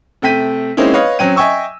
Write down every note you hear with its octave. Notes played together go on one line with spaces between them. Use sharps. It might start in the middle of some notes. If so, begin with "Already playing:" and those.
C3 A3 G5 B6 D#7
G#3 A#3 C4 C#4 D#4 E4
B4 C#5 D#5 F5
F#3 C4 C#4 G5 D#7
D#5 E5 G5 G#5 C#6 E6